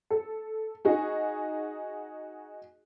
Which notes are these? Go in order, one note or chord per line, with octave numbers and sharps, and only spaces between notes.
A4
D#4 F#4 G#4